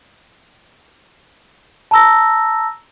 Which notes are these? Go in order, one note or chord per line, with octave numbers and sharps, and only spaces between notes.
A5 A#5 E6 A#6